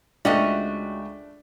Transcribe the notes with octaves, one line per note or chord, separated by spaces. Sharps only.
C#2 A3 C#4 D4 F#4 D#5 E5 G5